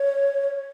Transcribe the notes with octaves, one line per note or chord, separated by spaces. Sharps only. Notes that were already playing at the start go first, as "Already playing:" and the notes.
Already playing: C#5